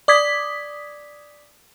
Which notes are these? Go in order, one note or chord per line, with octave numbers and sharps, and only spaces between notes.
D5 D6 D#6 G#6 B6